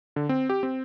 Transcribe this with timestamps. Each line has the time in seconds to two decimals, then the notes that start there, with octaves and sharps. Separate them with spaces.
0.16 D3
0.29 C4
0.49 G4
0.63 C4